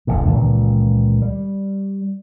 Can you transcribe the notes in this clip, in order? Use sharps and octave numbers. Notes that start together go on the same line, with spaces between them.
D1 A#1 F2 A2
C#2 A#2 D#3 E3
G3